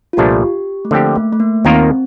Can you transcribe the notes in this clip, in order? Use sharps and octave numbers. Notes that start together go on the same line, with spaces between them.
F4
C2 A#2 F3 A3 D4 G4
A3
D3 F3 A#3 C4 G4
A3
A3
A#3
D#2 D#3 A#3 C4 F4 A#4